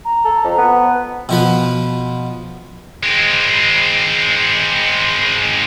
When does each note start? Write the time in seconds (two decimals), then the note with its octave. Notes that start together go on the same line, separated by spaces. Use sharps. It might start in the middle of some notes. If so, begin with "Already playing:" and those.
0.05 A#5
0.25 A4
0.45 F2
0.58 B3
1.29 B2 F3 B4
3.03 G#3 C4